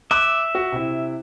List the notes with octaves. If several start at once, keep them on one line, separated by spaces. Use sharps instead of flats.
E5 D6 F#6
F#4
C3 E4